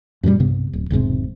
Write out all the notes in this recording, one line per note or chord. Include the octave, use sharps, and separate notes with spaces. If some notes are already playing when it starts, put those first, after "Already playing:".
F#2 A#2 E3 G3
B1 G2 C3 B3
D1
E1 B1 G#2 C3